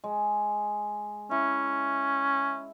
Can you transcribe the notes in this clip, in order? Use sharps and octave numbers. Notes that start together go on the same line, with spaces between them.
G#3
C#4 E4